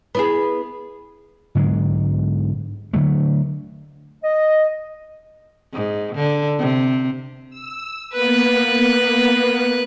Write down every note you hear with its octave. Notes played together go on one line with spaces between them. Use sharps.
B3 E4 G#4
G#2 D3 F#3 G#3
D3 F#3 A3
D#5
G#2
D3
C3
E6
A#3 B3 B4 F#6